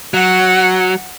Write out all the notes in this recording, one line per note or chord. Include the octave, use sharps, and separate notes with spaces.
F#3 F#5